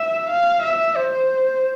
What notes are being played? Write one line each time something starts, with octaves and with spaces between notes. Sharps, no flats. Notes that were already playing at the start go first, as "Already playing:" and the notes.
Already playing: E5
F5
E5
C5